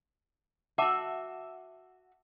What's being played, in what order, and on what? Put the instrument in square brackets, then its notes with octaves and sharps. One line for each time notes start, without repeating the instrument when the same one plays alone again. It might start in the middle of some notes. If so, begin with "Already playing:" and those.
[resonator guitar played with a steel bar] F#4 E5 [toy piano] F#5 A5 D6